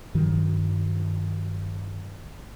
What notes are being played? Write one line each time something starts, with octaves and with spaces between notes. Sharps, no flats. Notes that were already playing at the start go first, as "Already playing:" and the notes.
G2 D#3 F#3